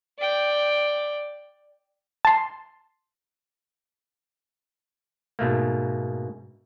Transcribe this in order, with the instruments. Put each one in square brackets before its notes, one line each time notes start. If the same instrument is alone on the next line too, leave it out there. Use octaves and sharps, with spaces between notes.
[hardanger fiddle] D5 G5
[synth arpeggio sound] A5 C6
[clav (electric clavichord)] G#2 B2 A3 A#3